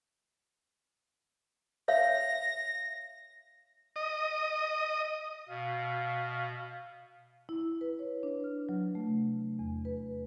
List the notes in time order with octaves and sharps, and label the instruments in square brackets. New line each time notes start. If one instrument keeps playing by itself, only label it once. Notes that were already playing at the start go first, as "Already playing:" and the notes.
[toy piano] C#5 E5 F5 [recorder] A#6
[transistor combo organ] D#5
[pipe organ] B2 [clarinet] F5
[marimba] E4
B4
C#5
D4
F6
F#3
A3
C3
E2
B4